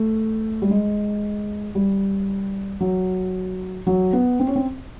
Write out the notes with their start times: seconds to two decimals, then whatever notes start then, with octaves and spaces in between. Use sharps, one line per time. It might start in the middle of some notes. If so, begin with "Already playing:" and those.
Already playing: A3
0.62 G3
0.69 G#3
1.75 G3
2.80 F#3
3.87 F#3
4.13 B3
4.40 C4
4.47 C#4
4.56 C4